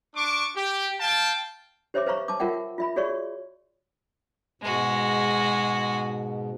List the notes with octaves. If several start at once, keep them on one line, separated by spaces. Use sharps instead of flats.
D4 C#6 D6
G4
F5 G5 A5
G4 C5 C#5 E5 C6 D6
B4 C5 F5 A#5 C#6
A5 D6
F4 A#4 E5 F#5 G5
F4 E5 B5
F#4 G#4 C#5 D5 C#6
G#2 B2 G#3 F#4